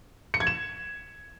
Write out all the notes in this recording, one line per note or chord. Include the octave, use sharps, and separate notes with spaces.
C#7
G#6
E7